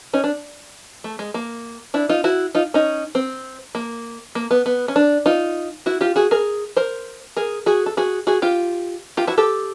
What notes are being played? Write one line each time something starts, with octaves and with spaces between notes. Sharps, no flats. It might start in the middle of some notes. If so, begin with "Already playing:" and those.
C#4 D#4
D4
A3
G#3
A#3
D4 E4
D#4 F4
E4 F#4
D#4 F4
C#4 D#4
C4
A#3
A#3
B3
B3
C#4
D4
D#4 F4
E4 F#4
F4 G4
F#4 G#4
G#4 A#4
A#4 C5
G#4 A#4
F#4 G#4
A4
F#4 G#4
F#4 G#4
F4 G4
F4 G4
E4 F#4
G4 A4